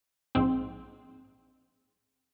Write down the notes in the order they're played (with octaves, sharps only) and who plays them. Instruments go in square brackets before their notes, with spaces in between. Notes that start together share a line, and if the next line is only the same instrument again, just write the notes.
[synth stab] A#1 G#2 C4